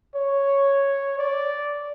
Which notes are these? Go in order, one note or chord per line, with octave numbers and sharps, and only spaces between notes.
C#5
D5